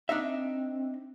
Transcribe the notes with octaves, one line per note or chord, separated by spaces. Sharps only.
C4 D4 D#4 E5